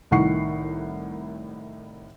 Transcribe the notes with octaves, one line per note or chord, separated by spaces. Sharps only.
C2 A2 D#3 F#5 C#6 C7